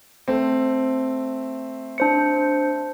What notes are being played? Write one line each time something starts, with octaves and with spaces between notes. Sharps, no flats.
A3 C4
D4 C5 C#7